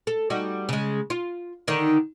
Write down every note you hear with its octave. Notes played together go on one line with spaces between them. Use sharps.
A4
G3 D#4 F#4
C#3 G#3
F4
D3 D#3 D#4